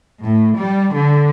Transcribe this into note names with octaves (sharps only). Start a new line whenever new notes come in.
A2
G3
D3